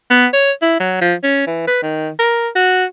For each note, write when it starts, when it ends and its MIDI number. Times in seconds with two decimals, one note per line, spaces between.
0.10 0.26 59
0.33 0.52 73
0.62 0.79 64
0.80 1.00 54
1.01 1.14 53
1.23 1.43 61
1.47 1.63 52
1.67 1.80 71
1.82 2.11 51
2.19 2.49 70
2.56 2.85 66